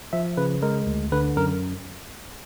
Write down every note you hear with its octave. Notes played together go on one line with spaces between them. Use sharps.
F3 E5
C#3 B4
G#3 A#4
D2
D3 B4
F#2 A#4